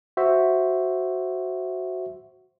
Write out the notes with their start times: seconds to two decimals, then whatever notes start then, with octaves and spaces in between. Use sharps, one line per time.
0.17 F#4 C5 E5